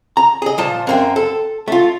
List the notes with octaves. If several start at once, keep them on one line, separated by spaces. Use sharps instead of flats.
A#5
G#4 D#5
A#2 F3 A5
F#2 A#3 C4
A4
A3 F4